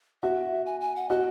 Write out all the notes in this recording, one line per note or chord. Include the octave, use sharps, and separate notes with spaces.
F#4 E5
G#5
G#5
F#5
F#4 D#5